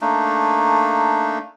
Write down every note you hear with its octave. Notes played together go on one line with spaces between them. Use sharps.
A3 A#3 D4 D#4